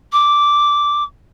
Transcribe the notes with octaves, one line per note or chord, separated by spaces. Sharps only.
D6